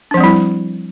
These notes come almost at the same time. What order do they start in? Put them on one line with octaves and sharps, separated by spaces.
D4 F3 C4 G3 E4